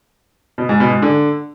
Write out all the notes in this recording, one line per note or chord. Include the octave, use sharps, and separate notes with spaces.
B2
G#2
B2
G#2
D3